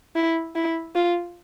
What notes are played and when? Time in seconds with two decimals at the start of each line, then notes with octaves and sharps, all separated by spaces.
0.15 E4
0.55 E4
0.95 F4